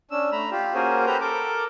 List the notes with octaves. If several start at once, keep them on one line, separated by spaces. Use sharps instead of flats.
C#4 D4 E6
A3 A#5 B5
F4 G4
A#3 C#4 F#4 G#4 A#4 C5
G4 A4 B4 C5 A#5 G6
A4 A#4 D6